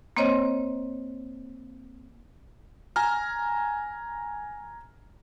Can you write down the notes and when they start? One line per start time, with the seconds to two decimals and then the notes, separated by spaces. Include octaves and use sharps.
0.17 A#3 C4 C5 C#5 D#5
2.96 G#5 A#5 F6